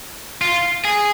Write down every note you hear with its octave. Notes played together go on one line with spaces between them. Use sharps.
F4
G#4